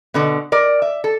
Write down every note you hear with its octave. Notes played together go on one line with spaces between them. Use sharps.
B2 D3 B3
A#4 D5
E5
A4